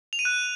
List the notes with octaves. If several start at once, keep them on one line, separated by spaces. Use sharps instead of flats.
F7
D#7
F#6